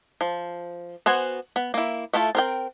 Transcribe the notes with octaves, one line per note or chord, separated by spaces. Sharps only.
F3
B3 F#4 C5 G#5
B3
A#3 E4
A3 E4 F4 A4
C4 A#4 G5